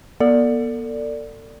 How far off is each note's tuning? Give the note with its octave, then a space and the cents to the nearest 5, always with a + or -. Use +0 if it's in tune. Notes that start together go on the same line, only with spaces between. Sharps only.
B3 -40 A4 +35 D5 +0